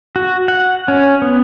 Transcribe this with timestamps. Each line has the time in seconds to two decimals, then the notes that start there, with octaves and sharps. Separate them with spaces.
0.16 F#4
0.48 F#5
0.88 C#4
1.22 B3